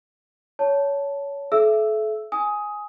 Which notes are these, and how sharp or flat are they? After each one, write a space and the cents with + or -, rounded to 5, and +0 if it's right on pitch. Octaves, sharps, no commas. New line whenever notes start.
C#5 +20 A5 +0
A4 -35 E5 +20 E6 +0
G#5 +0 D#6 +15